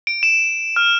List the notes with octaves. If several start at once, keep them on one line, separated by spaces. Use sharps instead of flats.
D7
E7
F6